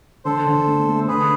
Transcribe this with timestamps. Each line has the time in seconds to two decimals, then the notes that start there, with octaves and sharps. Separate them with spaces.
0.25 D3 A4 C5
0.46 D3
0.67 A3
0.88 A3
1.08 D3 G#4 B4